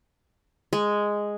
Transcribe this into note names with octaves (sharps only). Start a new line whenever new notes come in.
G#3